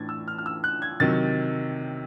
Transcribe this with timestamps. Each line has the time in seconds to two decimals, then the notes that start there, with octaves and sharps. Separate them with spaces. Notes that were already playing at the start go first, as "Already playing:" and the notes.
Already playing: A2 E3 A3 D4 G#6 A6
0.09 E6
0.28 F6
0.38 F6
0.46 E6
0.64 F#6
0.82 G#6
1.00 C3 D#3 F#3 A6